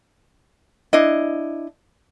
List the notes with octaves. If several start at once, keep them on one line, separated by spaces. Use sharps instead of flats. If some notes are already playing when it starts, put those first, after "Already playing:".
D4 E4 D#5